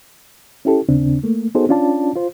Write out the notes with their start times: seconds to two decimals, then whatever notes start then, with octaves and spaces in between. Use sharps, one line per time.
0.65 C#4 E4 G4 A4
0.89 D#2 C#3 C4 D4
1.24 A3 A#3
1.55 B3 D#4 F#4 G#4 A4 C5
1.69 C#4 D4 F4 D5 A5
2.15 F4 C5